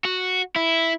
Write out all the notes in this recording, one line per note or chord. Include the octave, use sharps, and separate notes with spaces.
F#4
E4